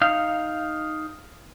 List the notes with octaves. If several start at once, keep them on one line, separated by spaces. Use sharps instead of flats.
D#4 F5